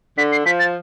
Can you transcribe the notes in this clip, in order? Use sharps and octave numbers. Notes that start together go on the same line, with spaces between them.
D3 B6
C7
F3 B6
A6